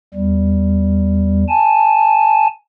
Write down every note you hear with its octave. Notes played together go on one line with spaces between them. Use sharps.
E2 G3
G#5 A5